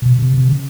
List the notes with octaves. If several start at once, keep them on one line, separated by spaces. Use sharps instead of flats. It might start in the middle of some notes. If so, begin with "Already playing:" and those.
B2
C3
C3
C#3